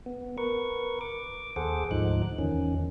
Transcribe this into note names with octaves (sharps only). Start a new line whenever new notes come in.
B3
A#4 B4 C#6
D6
D#2 G#4 A4 C5 F#5 D6
D2 G#2 F3 D#4 F#6
E2 D#3 C#4